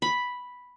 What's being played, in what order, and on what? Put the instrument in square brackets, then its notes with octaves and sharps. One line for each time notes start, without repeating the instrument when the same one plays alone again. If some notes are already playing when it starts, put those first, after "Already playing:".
[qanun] B5